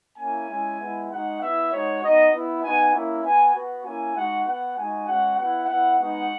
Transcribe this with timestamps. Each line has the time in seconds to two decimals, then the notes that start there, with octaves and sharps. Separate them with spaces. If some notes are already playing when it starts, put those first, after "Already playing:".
0.19 A#3 C#4 E4 G#5
0.49 G#3 C#4 E4
0.80 G#3 B3 E4
1.10 G#3 D#4 F#4 F#5
1.41 B3 E4 E5
1.72 G#3 D#4 F#4 C#5
2.02 B3 D#4 F#4 D#5
2.32 B3 E4
2.63 B3 D#4 F#4 G#5
2.94 A#3 C#4 E4
3.24 B3 F#4 G#5
3.55 B3 F#4
3.86 A#3 C#4 E4 G#5
4.16 G#3 D#4 F#4 F#5
4.46 B3 F#4 F#5
4.77 G#3 D#4 F#4 G#5
5.07 G#3 C#4 F#4 F#5
5.37 B3 E4 F#5
5.68 B3 E4 F#5
5.99 G#3 B3 D#4 F#4 F#5